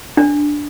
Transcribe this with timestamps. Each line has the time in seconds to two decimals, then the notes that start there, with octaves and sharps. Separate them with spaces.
0.17 D4